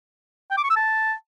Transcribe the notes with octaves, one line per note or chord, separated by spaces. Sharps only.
G5
D6
C#6
E6
A5